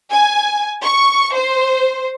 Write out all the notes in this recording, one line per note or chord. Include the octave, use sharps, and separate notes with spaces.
G#5
C#6
C5